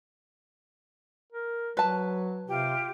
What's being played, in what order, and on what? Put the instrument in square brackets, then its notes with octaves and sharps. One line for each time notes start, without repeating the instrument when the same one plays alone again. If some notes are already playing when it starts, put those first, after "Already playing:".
[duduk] A#4
[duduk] F#3 [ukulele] B4 A5
[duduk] C3 [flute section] F4 G4